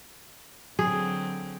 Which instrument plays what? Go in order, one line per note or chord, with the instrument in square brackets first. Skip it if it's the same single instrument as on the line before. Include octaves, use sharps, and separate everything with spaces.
[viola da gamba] D3 F#3 C4 [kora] G#4